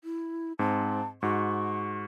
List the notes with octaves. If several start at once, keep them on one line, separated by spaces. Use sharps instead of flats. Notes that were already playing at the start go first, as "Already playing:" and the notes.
E4
G#2 C4 A5
G#2 F#4 C#6